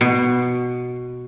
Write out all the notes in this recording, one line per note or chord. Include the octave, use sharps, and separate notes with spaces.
B2